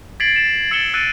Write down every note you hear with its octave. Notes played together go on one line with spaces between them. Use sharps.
G#6 A6 B6 C7 D7 F#7
A6 E7
E6 A6 C#7 D7 E7 G7
E6 F#6 A6 D7 D#7